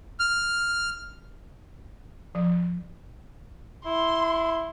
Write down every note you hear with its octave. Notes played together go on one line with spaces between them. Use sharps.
F6
F3
E4 C6